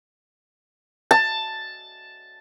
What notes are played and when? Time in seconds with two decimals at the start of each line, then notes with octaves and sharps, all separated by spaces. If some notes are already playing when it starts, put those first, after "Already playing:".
1.11 A5